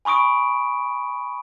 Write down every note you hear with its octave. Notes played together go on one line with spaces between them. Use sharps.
G#5 B5 C#6 D#6 D7